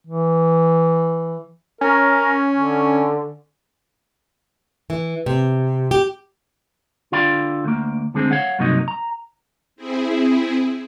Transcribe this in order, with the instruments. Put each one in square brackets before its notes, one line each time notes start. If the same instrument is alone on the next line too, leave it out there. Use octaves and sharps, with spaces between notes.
[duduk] E3
[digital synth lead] C#4 [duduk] A#4
[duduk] D3
[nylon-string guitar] E3
C3
G4
[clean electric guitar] D3 F4 D5 F5 G5 B5
D2 A#3
D2 D3 G#3 C4 G#4
C#5 F5 F#5
G2 C3 F#3 A#3 D#4 D#5
A#5
[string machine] C4 E4 G#4